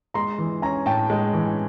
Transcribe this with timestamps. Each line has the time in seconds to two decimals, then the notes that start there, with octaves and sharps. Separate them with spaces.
0.14 G#3 A#5 C6
0.38 E3
0.62 C#4 G#5 A#5
0.86 A2 G5 A5
1.10 G#3
1.33 E3